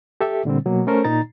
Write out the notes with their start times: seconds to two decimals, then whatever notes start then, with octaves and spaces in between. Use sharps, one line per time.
0.21 G4 A4 E5
0.45 A#2 D3 G3 C4
0.66 B2 F#3 A#3
0.87 A3 C#4 A4 A#4 C5
1.04 A#2 D#4 A#5 A6